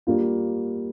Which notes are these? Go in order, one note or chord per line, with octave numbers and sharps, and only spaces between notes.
G3 A#3 F4